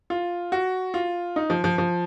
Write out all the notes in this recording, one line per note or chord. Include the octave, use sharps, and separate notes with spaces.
F4
F#4
F4
D#4
F3
F3
F3